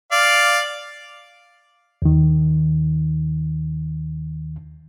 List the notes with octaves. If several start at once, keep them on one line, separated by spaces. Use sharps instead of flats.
D5 F5
D#2 D#3